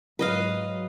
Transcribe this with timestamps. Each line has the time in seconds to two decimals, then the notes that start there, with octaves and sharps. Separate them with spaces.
0.19 G#2 F#3 B4 D#5 F5